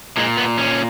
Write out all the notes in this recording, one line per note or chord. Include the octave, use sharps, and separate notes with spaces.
A#2 G#3
B3
C#4